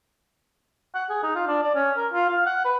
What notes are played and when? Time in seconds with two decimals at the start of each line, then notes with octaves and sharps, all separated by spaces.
0.94 F#5
1.10 G#4
1.23 D#4
1.35 F4
1.47 D4
1.63 D5
1.75 C#4
1.97 A#4
2.13 F4
2.29 F5
2.46 F#5
2.65 B4